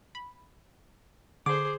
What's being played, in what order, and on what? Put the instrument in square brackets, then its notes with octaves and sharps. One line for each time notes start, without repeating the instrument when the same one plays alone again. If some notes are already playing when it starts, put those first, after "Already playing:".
[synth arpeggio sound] B5
[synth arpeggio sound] D3 [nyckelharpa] G#4 C5 [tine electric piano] D6